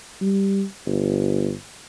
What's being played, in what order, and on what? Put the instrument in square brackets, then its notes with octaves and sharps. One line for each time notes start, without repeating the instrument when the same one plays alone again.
[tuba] G3
G1